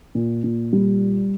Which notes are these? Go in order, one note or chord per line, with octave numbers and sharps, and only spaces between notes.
A#2
A#2
G3